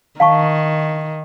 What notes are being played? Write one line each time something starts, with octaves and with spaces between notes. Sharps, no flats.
D#3 F5 A5 C#6